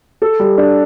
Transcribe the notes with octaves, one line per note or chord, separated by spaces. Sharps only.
A4
G3
D4